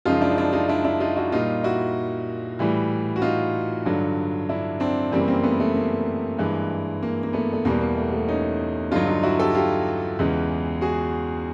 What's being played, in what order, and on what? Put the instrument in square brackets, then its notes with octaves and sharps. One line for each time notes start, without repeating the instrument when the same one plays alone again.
[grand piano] F#2 C#3 F3 G#3 D#4 F4
D4 E4
D#4
D4 E4
D#4 F4
D4 E4
D4 E4
D#4 F4
E4 F#4
A#2 G3 D#4 F4
E4 F#4
A2 E3 G3
F#4
D#4 F4
G2 D3 F#3
D4 E4
C4 D4
F#2 C#3 E3 G3 A#3 C4
A#3 C4
A3 B3
A3
A#3
G2 E3 G#3
A#3
A#3
A3 B3
A3
E2 B2 G3 A#3
A#3
A3
A3
C#4 D#4
G2 D3 F#3 D#4 F4
D#4 F4
E4 F#4
G4 A4
F4 G4
E2 C#3 E3 G#3
F#4 G#4